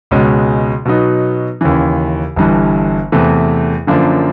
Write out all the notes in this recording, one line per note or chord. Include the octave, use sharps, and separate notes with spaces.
C#2 B2 G#3 C#4
B2 F#3 B3 D#4
D#2 C#3 E3
G1 G2 E3
E2 C3 E3 A3
F#2 D3 F3 A#3 D4